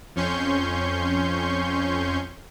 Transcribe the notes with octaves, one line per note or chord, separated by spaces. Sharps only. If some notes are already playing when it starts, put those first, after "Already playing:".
F2 C#4 C6 C#6 G6